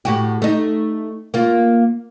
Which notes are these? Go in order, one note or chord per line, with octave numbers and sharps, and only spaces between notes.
A2 F#4 G4
A3 D#4
A#3 F4